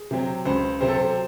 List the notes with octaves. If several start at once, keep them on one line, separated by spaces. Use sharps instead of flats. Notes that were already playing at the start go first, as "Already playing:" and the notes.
Already playing: G#4
C3 F#3 C4
C#2 C5
C3 F#3 C4 C5
A4
C5